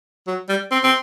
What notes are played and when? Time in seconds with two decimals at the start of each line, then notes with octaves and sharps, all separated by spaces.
0.27 F#3
0.49 G3
0.71 C4
0.84 C4